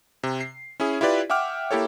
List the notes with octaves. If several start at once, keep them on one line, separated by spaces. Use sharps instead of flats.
C3
C7
C#4 E4 G#4
E4 F4 G4 B4 D5
E5 F#5 G5 D6 F6
A#3 E4 G4 A4 C#5